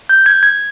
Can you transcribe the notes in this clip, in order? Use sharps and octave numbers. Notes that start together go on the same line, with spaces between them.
G6
G#6
G#6